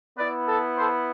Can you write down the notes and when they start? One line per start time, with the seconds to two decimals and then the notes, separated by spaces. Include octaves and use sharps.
0.18 B3 E4 B4 D5
0.48 A4
0.77 A4 C5